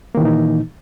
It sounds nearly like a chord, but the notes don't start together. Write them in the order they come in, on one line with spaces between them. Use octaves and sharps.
A#3 D#3 E3 A#2 D#4